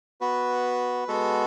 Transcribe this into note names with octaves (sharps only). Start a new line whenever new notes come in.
B3 F#4 B4
G#3 B3 F#4 A4